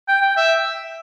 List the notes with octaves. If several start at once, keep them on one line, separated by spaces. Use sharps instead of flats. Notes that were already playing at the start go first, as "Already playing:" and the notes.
G5
G5
E5